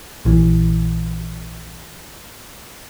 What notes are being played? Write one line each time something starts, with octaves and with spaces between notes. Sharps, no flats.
A#1 E3